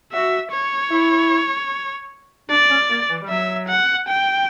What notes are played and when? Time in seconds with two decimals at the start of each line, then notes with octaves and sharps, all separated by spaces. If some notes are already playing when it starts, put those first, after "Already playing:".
0.12 F#4 E5
0.51 C#5
0.91 E4
2.49 D4 D5
2.70 C#4
2.90 A#3
3.09 E3
3.21 G3
3.29 F#3 E5
3.68 F#5
4.08 G5